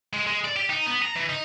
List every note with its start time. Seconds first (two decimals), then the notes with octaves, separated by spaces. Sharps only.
0.13 G#3
0.27 G#3
0.45 D5
0.56 G4
0.70 D#4
0.87 B3
1.02 A#5
1.16 E3
1.29 D#4